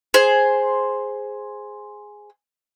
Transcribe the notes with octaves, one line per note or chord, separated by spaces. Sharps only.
G#4 C5